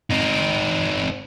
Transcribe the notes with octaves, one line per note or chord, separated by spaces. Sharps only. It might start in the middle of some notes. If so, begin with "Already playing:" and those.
C4 D#4